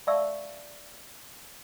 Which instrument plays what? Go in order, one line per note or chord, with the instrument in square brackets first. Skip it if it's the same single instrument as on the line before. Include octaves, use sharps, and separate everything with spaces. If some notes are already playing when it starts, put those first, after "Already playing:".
[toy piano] D5 E5 F5 A5 C#6 E6